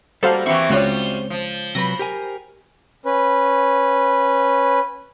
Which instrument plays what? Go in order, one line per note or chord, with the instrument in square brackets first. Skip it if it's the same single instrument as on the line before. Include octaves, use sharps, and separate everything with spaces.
[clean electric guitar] G3 [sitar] A#3 [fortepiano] F#4 [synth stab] A4 C5 F5
[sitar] E3 A#3 E4 [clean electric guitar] C4 G4 [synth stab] C#6
[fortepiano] C#2 C#5 [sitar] G3 F4 F#4
[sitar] F3
[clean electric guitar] C3 F#3 B4 [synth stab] B5 A#6
[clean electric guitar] G4 A#4 G#5
[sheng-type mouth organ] C#4 B4